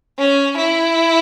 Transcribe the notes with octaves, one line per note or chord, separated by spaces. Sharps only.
C#4
E4